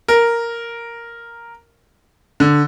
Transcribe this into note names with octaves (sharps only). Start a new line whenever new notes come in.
A#4
D3